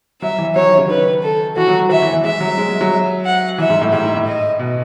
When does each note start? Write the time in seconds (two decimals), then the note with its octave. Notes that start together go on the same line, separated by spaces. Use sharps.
0.22 F#3 E5
0.38 E3
0.55 F#3 C#5
0.66 D#3
0.78 C#3
0.89 D#3 B4
1.22 A4
1.56 E3 F#4
1.68 F#3
1.79 F#3
1.90 E3 E5
2.02 E3
2.13 E3
2.24 G#3 E5
2.40 F#3
2.58 G#3
2.69 G#3
2.81 F#3
3.26 F#5
3.58 E3 E5
3.70 G#2
3.81 A2
3.93 A2 E5
4.04 G#2
4.16 A2
4.27 D#5
4.59 B2